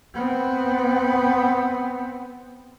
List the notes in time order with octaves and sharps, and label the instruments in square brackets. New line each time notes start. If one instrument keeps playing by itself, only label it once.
[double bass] B3 C4